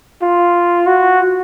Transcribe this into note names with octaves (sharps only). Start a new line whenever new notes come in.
F4
F#4